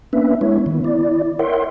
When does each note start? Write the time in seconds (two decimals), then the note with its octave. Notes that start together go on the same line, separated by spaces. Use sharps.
0.13 A#3 B3 C#4 D4 B4 E5
0.41 G#3 B3 E4 C#5
0.66 D#3 B3
0.84 E4 D5
1.39 A#4 C#5 E5 F#5 G5 C6